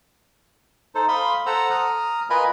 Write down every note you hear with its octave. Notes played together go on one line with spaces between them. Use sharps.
D#4 A4 C5
F5 B5 C6 D#6
A4 C5 F#5 A#5 E6
A#5 D#6 F6
F4 A#4 B4 D#5 G#5 B5